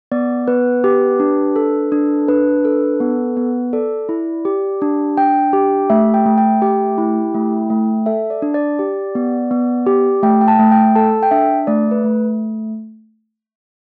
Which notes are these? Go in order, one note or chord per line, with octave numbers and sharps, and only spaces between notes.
B3 D5
B3 B4
G4
D4
A4
D4
D4 B4
A4
B3
B3
A4 D5
E4
G4
D4
D4 G5
G4
A3 E5
G5
A3
G5
G4 G5
E4
A3
A3
A4 E5
D5
D4
D5
G4
B3
B3
G4
A3 G5
G5
A5
A3
G5
A4 A5
G5
D4 E5
A3 D5
B4
A3